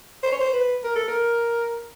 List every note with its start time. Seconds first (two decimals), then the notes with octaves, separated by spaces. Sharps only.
0.23 C5
0.32 C#5
0.40 C5
0.53 B4
0.84 A#4
0.95 A4
1.08 A#4